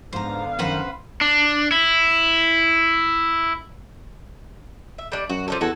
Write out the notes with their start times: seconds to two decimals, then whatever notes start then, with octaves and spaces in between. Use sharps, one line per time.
0.13 G#2 D3 B3 C5 F5 A#5
0.59 F#2 D#3 F#4 B4 C5
1.21 D4
1.72 E4
4.98 E5
5.12 G3 D4
5.30 F#2 F#4
5.48 F3 D4 A4
5.61 E2 F#4 A4 G#5